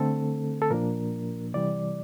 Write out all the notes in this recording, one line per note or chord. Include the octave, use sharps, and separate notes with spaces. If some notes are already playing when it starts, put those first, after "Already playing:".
Already playing: D3 A3 C4 A4
A4
A#2 F3 A#3 D4 A#4
C3 E3 G3 D5